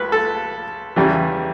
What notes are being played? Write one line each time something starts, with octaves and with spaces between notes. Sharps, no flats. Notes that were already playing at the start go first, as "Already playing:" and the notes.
Already playing: C#2 B4
A4
E2 C#3 E3 G3